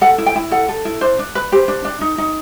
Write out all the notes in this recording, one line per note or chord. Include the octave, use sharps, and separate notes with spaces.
A4 F#5
E4
G5
E4
A4 F#5
A4
E4
D4 C5
D4
B4
G4 C5
D4
D4
D#4
D#4